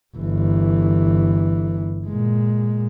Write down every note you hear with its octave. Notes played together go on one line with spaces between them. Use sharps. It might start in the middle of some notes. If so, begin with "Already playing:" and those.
G1 E3
A#2 G#3